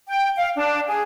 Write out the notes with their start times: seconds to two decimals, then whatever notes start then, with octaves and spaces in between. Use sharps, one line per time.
0.08 G5
0.37 F5
0.56 D4
0.87 G#4